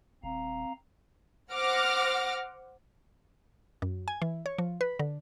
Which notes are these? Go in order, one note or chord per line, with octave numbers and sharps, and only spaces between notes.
D#1 C4 F5 A#5
C5 F#5 D6 F6 A#6
F#2
G#5
E3
C#5
F3
B4
D3